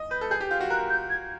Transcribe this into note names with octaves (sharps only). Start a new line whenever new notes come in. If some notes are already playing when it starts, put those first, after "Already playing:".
Already playing: D#5
B4 G6
A4
G#4 G6
G4
F4 G6
F#4
A#4 F#6
G6
G#6